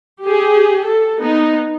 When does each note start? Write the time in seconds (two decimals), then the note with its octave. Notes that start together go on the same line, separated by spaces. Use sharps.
0.24 G4 G#4
0.84 A4
1.20 B3 D#4